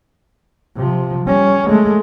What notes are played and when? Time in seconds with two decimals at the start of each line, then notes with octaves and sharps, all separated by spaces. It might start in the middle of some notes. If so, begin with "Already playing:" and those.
0.76 C3 F3
1.26 G3 C#4
1.66 G#3 A3